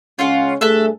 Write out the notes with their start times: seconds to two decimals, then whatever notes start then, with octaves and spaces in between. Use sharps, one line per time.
0.19 C#3 G#3 C#4 F4 F5 F#5
0.61 G2 A3 G#4 A4 E5 F#6